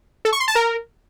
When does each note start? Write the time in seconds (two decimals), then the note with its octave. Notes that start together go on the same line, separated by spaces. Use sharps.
0.25 A4
0.32 C#6
0.40 C6
0.48 A5
0.55 A#4